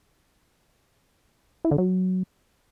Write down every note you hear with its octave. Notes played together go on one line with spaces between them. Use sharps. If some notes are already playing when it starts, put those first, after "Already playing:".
E4
D3
F#3